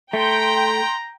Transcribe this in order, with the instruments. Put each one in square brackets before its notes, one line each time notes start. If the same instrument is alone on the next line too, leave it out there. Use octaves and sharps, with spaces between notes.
[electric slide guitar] A3 [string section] G5 [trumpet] A#5 [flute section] C6